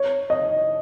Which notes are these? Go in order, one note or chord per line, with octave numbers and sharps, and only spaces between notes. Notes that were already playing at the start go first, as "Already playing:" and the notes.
Already playing: C#5
D#5